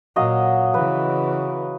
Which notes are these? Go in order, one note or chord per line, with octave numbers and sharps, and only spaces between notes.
A#2 F#3 D#5 F5
C#3 E3 B4